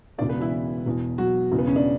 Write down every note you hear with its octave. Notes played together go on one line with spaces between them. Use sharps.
E1 E2 C#3 E3 D4 D5
B3 B4
E3 E4
E1 E2 B2
F#3 F#4
E1 E2 C#3
B3
C#4
D4